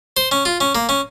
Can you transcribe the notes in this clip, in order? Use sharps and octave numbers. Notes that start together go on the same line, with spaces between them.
C5
C#4
F4
C#4
A#3
C#4